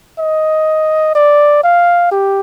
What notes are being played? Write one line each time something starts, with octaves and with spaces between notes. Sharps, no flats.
D#5
D5
F5
G4